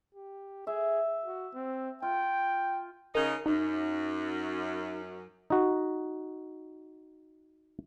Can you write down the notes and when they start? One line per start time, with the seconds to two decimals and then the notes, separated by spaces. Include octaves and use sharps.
0.15 G4
0.67 G#4 E5
1.25 F#4
1.54 C4
2.02 F4 G5
3.15 C#3 D#4 A#4
3.46 F#2 D#4
5.50 D#4 F#4